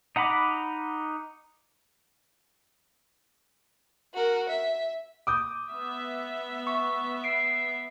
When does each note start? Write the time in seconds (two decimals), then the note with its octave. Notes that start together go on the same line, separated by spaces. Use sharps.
0.16 D#4 F#5 A#5 B5 D6
4.14 F#4 A#4
4.49 E5
5.27 D6 D#6 G6
5.70 B3 E5
6.67 C#6
7.24 C7 D7